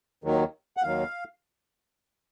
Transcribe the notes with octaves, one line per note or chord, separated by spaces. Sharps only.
D#2 D#3 F#3
F#5
D#2 D#3 F#3 F5